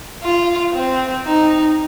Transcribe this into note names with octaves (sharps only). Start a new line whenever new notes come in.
F4
C4
D#4